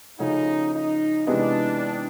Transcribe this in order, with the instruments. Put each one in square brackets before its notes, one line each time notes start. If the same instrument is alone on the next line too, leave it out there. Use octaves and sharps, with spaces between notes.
[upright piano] C#3 F3 A3 C#4 F#4 [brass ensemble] D#4
[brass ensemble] D#4
[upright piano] C3 E3 G#3 B3 D#4 [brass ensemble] D4